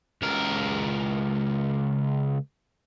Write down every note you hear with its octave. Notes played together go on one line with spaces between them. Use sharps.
C#2 A#4